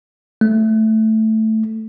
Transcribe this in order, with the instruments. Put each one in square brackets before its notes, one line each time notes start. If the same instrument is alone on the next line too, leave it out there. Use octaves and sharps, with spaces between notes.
[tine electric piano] A3